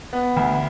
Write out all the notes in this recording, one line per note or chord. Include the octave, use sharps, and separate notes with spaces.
B3
D2